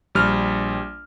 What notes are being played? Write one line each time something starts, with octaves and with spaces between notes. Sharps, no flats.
A#1 G3 F6